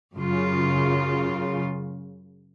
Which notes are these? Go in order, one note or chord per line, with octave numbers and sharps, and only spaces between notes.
F#2 C#3 F4